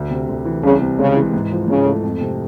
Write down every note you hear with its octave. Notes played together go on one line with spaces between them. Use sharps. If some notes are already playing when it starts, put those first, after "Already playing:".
Already playing: D2
C3
D2
E3
C2 C#3
C3
C#3 G#3
E3
G#2
F3
G#2 C#3
A3
F2
C3